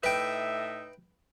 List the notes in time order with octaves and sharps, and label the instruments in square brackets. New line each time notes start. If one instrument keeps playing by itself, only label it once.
[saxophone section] A2 D#4 E5 [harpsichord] B4 G5